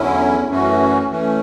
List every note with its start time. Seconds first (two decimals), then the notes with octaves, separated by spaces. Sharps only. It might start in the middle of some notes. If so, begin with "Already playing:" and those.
Already playing: E2 D3 F#3 C#4 E4
0.49 F#2 E3 A3 C#4 F#4
1.10 E3 A3 C#4